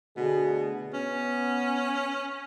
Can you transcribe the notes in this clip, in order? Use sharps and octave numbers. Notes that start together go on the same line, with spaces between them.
B2 D3 A3 G#4
B3 C#4